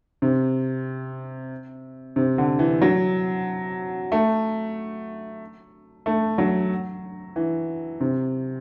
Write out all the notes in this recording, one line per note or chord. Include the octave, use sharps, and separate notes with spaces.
C3
C3
D3
E3
F#3
A3
A3
F#3
E3
C3